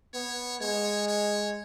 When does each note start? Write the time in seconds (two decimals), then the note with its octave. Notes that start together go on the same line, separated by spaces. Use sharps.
0.14 B3 C#5
0.61 G#3 C#5
1.08 C#5